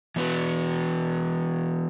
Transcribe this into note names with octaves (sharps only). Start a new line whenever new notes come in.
E3 B3 F#4 B4